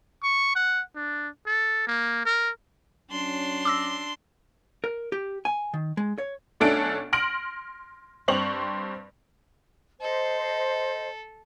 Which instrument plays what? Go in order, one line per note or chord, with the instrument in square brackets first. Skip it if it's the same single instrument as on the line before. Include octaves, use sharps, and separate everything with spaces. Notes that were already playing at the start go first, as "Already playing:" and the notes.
[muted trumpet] C#6
F#5
D4
A4
A#3
A#4
[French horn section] F#3 C#4 [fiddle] D4 C6
[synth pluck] D6 E6 A#6
[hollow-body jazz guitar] A#4
G4
G#5
D#3
G#3
C#5
[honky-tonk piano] B1 A3 C#4 D4 A4 D7
C6 F6 A#6 D7 F#7
G2 C4 C5 C#6 F7 F#7
[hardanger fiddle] A4 [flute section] C5 D#5